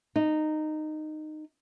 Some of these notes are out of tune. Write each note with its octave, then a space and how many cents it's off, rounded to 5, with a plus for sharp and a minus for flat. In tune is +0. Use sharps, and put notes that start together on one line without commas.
D#4 -15